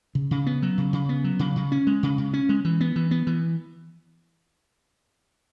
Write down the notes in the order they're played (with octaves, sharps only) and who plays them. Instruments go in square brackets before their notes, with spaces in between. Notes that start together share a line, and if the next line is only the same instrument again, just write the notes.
[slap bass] C#3
C#3
B3
F#3
C#3
C#3
B3
F#3
C#3
C#3
C#4
G#3
C#3
C#3
C#4
G#3
E3
B3
E3
B3
E3